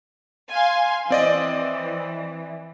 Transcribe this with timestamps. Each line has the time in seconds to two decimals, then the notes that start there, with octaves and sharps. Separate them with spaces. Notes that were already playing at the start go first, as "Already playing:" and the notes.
0.52 F5 G#5 C6
1.10 E3 C4 D5 D#5